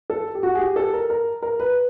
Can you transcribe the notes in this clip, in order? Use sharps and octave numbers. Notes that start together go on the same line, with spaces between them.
A4
G4
F#4
G#4
G4
A4
A#4
A#4
A#4
B4